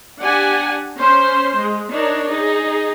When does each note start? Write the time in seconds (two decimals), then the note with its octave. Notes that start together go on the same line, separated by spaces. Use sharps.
0.21 D4 G4 D5 F#5 G#5
0.98 C#4 C5 C6
1.55 G#3
1.91 D4 D#4 A#4 C#5
2.28 D#4 G#4